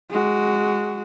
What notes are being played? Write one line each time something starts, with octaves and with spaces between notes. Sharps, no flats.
G#3 F#4